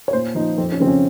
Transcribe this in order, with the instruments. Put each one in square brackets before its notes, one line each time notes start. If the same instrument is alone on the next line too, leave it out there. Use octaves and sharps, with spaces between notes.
[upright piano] C#5
A#2 C5
F3 D#4
F2 C4
C#4
C#3 F3 C4
C#4